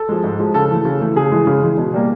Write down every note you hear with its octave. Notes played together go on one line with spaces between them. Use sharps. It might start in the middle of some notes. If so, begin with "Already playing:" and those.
Already playing: A4
F3 G#3
G#2
F3 G#3
C#3 A4
E3 A3
C#3
E3 A3
C#3 G#4
E3 G#3
C#3
E3 G#3
B2
G3 A#3